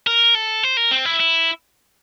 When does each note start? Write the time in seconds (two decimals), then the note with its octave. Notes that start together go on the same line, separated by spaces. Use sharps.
0.07 A#4
0.35 A4
0.63 C5
0.77 A#4
0.91 C4
1.05 E4
1.20 E4